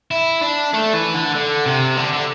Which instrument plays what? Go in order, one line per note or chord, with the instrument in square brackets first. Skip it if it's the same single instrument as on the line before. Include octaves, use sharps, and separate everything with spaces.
[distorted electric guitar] E4
D4
A3
E3
D3
D3
C3
D3
D3